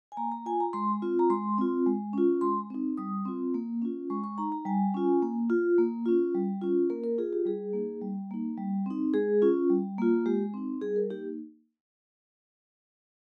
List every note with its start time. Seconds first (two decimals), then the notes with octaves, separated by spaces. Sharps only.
0.12 G#5
0.17 A#3 A#5
0.32 A#5
0.46 F4 G#5
0.60 A#5
0.73 G#3 C6
1.02 C4 F4
1.19 A#5
1.30 G#3 C6
1.58 C4 F4
1.86 G#3
2.13 C#4 F4
2.41 G#3 C6
2.70 C4 D#4
2.98 G3 D#6
3.25 C4 F4
3.54 A#3
3.82 C#4 F4
4.10 G#3 C#6
4.24 C#6
4.38 D#4 A#5
4.52 A#5
4.65 G3 G#5
4.94 C#4 F4
5.22 A#3
5.50 F4
5.78 A#3
6.06 C#4 F4
6.35 G3
6.62 C#4 F4
6.90 A#3 A#4
7.04 A#4
7.18 F4 G#4
7.33 G4
7.46 G3 G#4
7.73 A#3 D#4
8.01 G3
8.31 A#3 D#4
8.58 G3
8.86 C4 D#4
9.14 G#3 G#4
9.42 C#4 F4
9.70 G3
9.98 A#3 F4
10.26 G#3 G4
10.54 C4 D#4
10.82 G3 G#4
10.96 A#4
11.10 A#3 D#4 G4